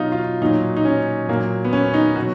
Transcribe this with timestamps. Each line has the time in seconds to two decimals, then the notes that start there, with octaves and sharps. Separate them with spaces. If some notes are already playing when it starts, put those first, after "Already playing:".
Already playing: B2 F#3 D#4 F4
0.12 F4
0.41 A#2 F#3 D#4
0.77 D#4
0.85 C#4
1.28 A#2 F#3 A#3
1.65 B3
1.73 C#4
1.94 D#4
2.16 B2 F#3 F#4